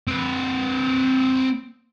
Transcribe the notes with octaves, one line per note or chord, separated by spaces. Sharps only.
C4 B4